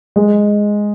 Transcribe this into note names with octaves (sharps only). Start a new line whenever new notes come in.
G#3